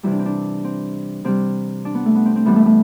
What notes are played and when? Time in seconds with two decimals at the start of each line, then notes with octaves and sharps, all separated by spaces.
0.03 C3 E3 G3 E4
0.11 D4
0.19 C4
0.26 D4
0.64 C4
1.24 C3 G3 C4
1.85 D4
1.95 B3
2.06 A3
2.15 B3
2.25 C4
2.36 C4
2.45 A2 E3 G3 B3
2.56 A3
2.66 A3